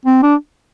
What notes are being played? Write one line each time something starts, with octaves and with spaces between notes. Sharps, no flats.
C4
D4